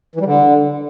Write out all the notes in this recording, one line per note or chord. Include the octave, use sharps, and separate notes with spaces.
E3
G3
D3